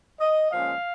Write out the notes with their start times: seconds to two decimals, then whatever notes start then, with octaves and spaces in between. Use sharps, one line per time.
0.20 D#5
0.51 A#2 F3 G#3 C#4 F5